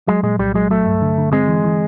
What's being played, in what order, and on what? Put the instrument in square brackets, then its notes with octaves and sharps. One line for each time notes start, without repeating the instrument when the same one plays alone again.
[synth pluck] F#3 [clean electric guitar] G#3
[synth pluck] A#2 [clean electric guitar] G#3
[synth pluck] C2 [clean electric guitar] G3
[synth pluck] F#3 [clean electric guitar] G#3
[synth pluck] F#3 [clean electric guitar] A3
[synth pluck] G2
D3
D3
[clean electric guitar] G#3 [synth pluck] C4
[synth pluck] E3
E3